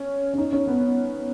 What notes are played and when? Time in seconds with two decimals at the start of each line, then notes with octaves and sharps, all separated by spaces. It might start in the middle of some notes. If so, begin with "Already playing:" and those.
Already playing: C#4
0.34 C#4
0.38 D#4
0.53 C#4
0.67 B3